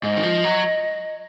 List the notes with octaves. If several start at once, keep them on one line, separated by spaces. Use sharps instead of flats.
G#2 D#5
D#3
F3
F#3